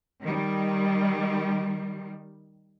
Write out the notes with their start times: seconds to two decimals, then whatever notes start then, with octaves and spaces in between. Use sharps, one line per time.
0.21 D#3 G3